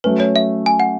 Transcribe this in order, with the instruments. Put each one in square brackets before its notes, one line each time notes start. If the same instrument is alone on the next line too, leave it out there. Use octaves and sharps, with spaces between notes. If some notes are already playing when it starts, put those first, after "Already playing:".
[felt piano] F#3 A3 C#4 [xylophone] B4
[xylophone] C#5
E5
G#5
F#5